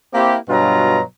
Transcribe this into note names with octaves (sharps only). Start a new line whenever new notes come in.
A#3 C4 E4 G4
G2 B2 F#3 F4 A#5